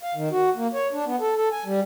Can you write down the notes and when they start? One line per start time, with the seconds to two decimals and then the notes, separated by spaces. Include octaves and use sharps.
0.03 F5
0.15 D#3
0.31 F#4
0.56 A#3
0.74 C#5
0.93 D4
1.06 B3
1.20 A4
1.36 A4
1.52 G#5
1.65 G3